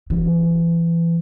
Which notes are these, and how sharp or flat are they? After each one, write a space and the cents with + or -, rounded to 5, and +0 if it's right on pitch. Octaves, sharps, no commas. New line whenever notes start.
E3 +30